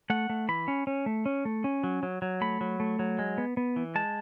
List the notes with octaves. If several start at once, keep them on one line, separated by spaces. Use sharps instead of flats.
A3 F#5
A3
E3 B5
C#4
C#4
A3
C#4
A3
C#4
F#3
F#3
F#3
A3 B5
F#3
A3
F#3
G#3
B3
B3
E3
G#3 A5